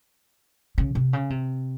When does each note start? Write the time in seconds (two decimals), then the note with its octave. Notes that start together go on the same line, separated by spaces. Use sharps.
0.78 C#3
0.95 C3
1.13 C#3
1.30 C3